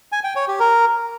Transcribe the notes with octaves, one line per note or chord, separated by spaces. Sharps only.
G#5
G5
C#5
G4
A#4